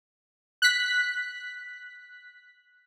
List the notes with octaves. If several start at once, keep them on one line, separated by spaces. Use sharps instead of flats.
F#6 B6